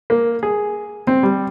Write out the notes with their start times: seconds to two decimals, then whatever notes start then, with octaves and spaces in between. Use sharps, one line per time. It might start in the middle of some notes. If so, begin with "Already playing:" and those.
0.10 A#3
0.43 G#4
1.07 C4
1.23 G3